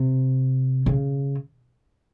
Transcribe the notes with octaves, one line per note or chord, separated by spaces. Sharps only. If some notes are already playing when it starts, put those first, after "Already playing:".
Already playing: C3
C#3